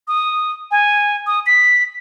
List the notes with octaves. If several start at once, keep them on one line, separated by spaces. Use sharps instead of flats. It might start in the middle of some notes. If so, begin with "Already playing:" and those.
D#6
G#5
D#6
B6